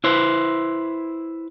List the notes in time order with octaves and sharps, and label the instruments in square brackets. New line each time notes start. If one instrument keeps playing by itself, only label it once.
[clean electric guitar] E4 B4 C5